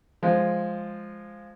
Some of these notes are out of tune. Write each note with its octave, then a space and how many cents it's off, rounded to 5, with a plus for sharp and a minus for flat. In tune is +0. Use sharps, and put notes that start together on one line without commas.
F3 +0 G#3 +0